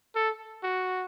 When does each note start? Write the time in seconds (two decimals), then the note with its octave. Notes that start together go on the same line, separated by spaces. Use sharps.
0.15 A4
0.63 F#4